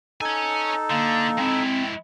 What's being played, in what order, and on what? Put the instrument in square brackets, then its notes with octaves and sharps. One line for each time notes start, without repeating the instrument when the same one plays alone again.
[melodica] D#4 A4 [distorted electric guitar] C#5 G#5
[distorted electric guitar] D3 [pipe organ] A#3
[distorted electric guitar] G#3 E4 [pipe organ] C4